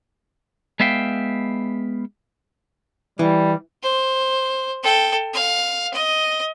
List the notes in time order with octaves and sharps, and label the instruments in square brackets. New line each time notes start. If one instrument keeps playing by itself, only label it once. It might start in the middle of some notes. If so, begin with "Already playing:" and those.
[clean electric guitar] G#3 B3 E5 F5 G5
[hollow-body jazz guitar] E3 [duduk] G3
[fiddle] C5
A4 G5
F5
D#5